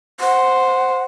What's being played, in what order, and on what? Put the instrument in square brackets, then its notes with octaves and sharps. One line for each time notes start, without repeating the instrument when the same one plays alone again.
[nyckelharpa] C5 [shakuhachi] F#5